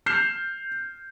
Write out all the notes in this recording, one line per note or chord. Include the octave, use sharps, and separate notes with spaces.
F6 G6 C7 E7